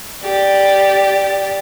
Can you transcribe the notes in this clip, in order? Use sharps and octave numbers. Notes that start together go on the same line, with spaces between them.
G4 D5